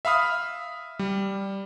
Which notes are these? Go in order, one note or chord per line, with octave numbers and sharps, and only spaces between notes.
E5 F5 B5 D#6 F6
G3